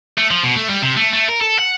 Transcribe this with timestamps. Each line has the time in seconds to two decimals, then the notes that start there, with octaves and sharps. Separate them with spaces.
0.18 A3
0.31 F3
0.43 B2
0.57 A3
0.69 G3
0.82 C3
0.97 A3
1.13 A3
1.29 A#4
1.41 A4
1.59 F#5